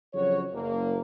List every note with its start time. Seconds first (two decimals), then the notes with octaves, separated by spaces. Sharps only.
0.14 F2 C#3 F#3 C#4 F#4 C#5
0.53 F#1 A#3